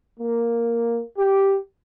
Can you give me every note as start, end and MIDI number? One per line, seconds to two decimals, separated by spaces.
0.20 1.02 58
1.17 1.57 67